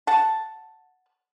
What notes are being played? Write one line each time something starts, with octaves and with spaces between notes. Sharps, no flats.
F#5 A5